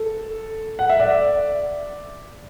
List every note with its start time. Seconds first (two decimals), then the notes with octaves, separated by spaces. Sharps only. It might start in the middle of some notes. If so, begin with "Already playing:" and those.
Already playing: A4
0.79 F#5
0.89 E5
1.00 D5